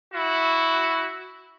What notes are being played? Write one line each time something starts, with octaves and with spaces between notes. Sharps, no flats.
E4 F#4